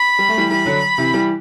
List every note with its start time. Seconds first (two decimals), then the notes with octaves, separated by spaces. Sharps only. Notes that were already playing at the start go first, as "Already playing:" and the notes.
Already playing: B5
0.18 G3
0.29 A3
0.37 E3 G3
0.50 E3 G3 B5
0.65 D3 F#3
0.98 C3 E3
1.14 E3 G3